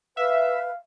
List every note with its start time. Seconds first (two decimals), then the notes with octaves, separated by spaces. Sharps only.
0.17 B4 E5 F5